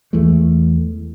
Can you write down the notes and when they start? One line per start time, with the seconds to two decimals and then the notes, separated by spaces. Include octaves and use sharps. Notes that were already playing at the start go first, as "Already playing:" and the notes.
0.13 E2 E3 G#3 A3